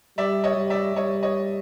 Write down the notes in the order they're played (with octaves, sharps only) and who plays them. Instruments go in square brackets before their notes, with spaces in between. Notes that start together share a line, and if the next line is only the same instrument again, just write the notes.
[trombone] G3 [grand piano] D5 E5
[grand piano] C#5 D#5
[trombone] G3
[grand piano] D5 E5
[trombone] G3 [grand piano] C#5 D#5
[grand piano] C#5 D#5